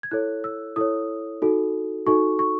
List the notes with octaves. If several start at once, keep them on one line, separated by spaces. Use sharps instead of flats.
G#6
E4 A4 C#5 F#6
E6
E4 A4 C#5 D#6
D#4 F#4 A4
D#4 F#4 A4 C#6
C#6